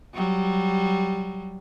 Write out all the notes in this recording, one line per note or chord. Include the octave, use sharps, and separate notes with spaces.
F#3 G3